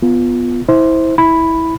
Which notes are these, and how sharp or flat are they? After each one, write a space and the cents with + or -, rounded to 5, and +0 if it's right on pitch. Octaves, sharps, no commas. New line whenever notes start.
B3 +0 F4 +0
E4 -20 C5 +0
E4 -15 B5 +0